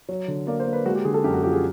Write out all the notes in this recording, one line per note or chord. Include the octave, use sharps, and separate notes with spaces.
F#3
D3
A#3 D5
C5
A#3
B4
G#3 F#4
G4
D3 G#4
A4
F#2 G4
F#4
F3 G4
G#4